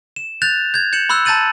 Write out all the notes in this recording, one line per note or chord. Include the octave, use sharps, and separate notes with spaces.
E7
F#6 G6 A6 F7
G6 G#6
G6 C#7 E7 F#7
B5 C6 E6 F#6
A5 A#5 G6 A6 D#7 F#7